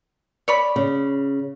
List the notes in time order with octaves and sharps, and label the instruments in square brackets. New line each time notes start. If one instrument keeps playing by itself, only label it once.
[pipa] C#5 D5 B5
[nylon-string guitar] C#3